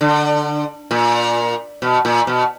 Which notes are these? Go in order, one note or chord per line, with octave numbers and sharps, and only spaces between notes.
D3
A#2
B2
A#2
B2